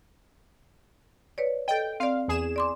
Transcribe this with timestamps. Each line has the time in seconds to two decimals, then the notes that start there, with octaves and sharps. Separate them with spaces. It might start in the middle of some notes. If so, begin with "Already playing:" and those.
1.38 B4 C#5 D5
1.68 A4 D#5 G5
2.00 C4 D5 F5
2.28 E2 G#4 E7
2.56 D5 C6 D6